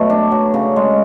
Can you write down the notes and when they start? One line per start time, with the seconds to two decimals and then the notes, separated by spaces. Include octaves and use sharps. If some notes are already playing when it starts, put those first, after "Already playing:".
Already playing: B2 F#3 A3
0.10 D4
0.32 F#3
0.54 C#3
0.76 G#3